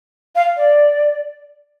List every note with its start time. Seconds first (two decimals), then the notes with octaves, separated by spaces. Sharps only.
0.35 F5
0.57 D5